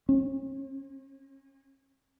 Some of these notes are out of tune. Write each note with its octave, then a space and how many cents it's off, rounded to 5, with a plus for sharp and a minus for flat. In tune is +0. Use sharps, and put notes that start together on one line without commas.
C#4 -40